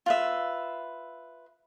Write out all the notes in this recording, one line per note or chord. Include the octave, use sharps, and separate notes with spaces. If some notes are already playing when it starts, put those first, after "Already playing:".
F4 B4 E5